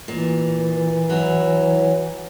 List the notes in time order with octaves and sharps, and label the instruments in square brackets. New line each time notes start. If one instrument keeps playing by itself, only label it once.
[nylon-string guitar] A#2 [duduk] E3
[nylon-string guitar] F#3 E4